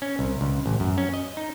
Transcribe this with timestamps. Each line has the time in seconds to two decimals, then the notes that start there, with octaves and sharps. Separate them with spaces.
0.02 C#4
0.19 C2
0.41 C#2
0.66 A1
0.80 F#2
0.98 C#4
1.13 D#5
1.37 D#4